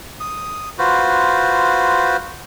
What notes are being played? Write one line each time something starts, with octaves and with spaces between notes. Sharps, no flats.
D#6
F4 F#4 B4 C5